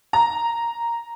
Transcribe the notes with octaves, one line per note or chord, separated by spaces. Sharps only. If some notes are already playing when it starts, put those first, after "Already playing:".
A#5